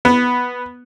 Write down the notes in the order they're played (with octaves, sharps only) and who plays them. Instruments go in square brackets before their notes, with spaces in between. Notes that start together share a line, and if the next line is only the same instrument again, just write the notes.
[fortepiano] B3